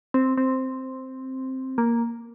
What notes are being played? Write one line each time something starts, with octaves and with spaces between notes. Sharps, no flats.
C4
C4
A#3